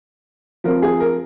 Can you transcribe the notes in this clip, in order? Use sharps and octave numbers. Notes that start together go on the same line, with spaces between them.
F3 C4 A#4
G#4
A#4